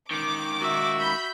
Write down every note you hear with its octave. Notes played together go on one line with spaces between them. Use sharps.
C#2 D#3 D6
F#4 E5
B5 G6